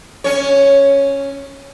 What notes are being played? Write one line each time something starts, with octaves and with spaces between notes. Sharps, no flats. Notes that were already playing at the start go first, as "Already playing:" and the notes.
C#4 C#5